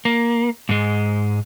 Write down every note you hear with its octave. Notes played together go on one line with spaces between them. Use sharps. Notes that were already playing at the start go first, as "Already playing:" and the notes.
A#3
G#2 G#3